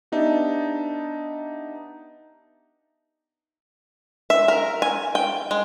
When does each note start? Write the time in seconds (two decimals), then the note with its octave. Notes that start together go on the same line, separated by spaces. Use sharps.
0.12 B3 D4 D#4 G4 E5 A5
4.30 E5
4.48 A#4
4.82 G#5
5.15 G5
5.51 G#3